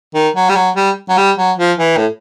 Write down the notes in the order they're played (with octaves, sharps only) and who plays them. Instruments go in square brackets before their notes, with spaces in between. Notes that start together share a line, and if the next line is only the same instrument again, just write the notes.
[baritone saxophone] D#3
F#3
G3
F#3
G3
F#3
G3
F#3
F3
E3
A2